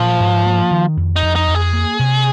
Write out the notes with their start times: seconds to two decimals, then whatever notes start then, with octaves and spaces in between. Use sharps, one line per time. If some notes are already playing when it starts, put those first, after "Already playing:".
Already playing: A#2 F3
0.20 G#2
0.46 A#3
0.71 D#3
0.97 F2
1.16 D#4
1.23 F2
1.36 D#4
1.48 F2
1.55 G#4
1.73 A#3
1.99 C3